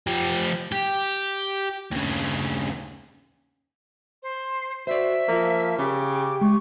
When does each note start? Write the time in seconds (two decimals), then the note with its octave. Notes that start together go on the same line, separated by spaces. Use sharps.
0.07 F3 G4
0.72 G4
1.92 D#2 C#3
4.23 C5
4.87 F#4 C5 D5 E5
5.28 F3 A#3
5.78 C#3 G4 D6
6.41 G#3 C#6